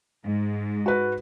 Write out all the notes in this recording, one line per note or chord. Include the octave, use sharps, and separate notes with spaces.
G#2
F#4 B4